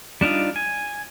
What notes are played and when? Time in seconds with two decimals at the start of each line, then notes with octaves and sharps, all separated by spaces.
0.21 G3 D4 D#4 F4
0.56 G#5